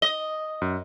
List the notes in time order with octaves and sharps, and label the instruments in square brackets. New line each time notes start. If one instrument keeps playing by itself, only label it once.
[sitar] D#5 [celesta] G7
[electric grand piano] F#2